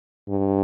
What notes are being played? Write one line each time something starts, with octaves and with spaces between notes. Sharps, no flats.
G2